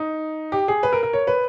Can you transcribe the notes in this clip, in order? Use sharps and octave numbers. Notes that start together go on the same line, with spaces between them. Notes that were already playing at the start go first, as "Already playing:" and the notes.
Already playing: D#4
G4
G#4
B4
A#4
A#4
C#5
B4